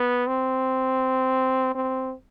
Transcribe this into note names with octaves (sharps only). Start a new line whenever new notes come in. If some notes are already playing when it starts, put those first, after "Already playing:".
Already playing: B3
C4
C4